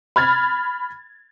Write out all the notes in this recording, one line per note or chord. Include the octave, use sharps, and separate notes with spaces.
B5 F6 G#6 A6